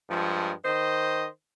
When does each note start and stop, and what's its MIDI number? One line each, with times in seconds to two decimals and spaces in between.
0.10 0.52 43
0.10 0.52 53
0.10 0.52 56
0.65 1.27 51
0.65 1.27 72
0.65 1.27 75